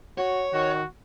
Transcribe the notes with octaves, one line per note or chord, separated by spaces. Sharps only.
F#4 C#5
D#3 F#4